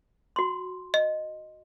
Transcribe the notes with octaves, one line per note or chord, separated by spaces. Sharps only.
F#4 C6
D#5